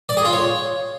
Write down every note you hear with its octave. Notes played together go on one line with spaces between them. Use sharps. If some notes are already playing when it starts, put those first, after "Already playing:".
D5
G#4
F4
C#5